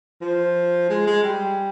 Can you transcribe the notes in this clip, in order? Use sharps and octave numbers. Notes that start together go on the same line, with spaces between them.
F3
G#3
G#3
G3